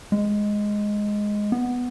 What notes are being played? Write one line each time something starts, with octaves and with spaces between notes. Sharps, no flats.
G#3
B3